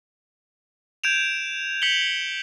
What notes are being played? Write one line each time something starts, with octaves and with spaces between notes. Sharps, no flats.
G6 G#6 D7 E7 F7
G6 B6 C#7 F#7 G7